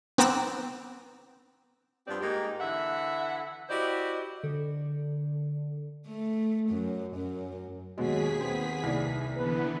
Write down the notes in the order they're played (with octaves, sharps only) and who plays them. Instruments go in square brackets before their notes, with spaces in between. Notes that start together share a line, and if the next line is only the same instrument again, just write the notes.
[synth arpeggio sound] B3 C4 A#5 D6 E6 F#6
[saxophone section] G2 F3 B3 C4 G4 D5
G#2 A#3 D#4 G4
D3 E3 E5 F#5
E4 F#4 G4 C5 D5 D#5
[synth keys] D3
[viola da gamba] A3
F#2
F#2
[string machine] D#2 G#4 B6 [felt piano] B2 G#3 [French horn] F#3
[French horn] B3 [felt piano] C4
[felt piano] C2 D5
[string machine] D3 E3 B3 [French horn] B4